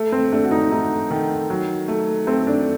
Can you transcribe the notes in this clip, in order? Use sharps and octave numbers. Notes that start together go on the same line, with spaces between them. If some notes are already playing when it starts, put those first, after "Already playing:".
Already playing: A3
C4
A3 D4
F#4
D#4
A3 D#4
D#3
F#3
A3
A3 C4
D4